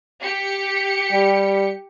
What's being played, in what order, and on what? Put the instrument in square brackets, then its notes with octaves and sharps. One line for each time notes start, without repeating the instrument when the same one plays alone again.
[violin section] G4 C#7
[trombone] G3